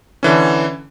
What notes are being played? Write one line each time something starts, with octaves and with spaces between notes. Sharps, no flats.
D3 E3 C#4